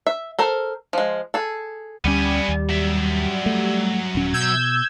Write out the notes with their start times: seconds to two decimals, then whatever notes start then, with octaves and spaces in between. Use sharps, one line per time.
0.07 E5
0.39 A4 A#4 C5
0.93 F3 G#3
1.34 G#4 A4
2.05 D2 G3 B3 C#4 G#5
2.49 D#2
2.69 F#3 E5
3.46 A3
4.15 D#1 C#4
4.33 B2 E6 G6 G#6